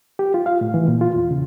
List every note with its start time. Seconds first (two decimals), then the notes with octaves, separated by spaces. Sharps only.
0.19 G4
0.34 F4
0.46 F5
0.61 A2
0.74 E3
0.88 A#2
1.01 F4
1.15 E2
1.31 C#3